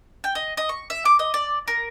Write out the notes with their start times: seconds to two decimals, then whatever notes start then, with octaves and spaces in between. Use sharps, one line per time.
0.24 G5
0.35 D#5
0.57 D#5
0.69 C#6
0.90 E5
1.05 D6
1.19 D#5
1.34 D5
1.68 A#4